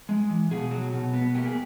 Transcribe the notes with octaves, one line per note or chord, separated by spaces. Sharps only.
G#3
E3
B2 G#4
F#3
B2
B3
A#3 G4
G#4